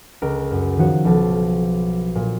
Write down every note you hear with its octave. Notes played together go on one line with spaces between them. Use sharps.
C#2 A#4 D7
F#2
D#3 F3 F#4 C#5
B1 F3 A5
A#2